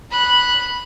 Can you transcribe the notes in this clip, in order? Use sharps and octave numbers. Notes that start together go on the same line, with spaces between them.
B5 F#6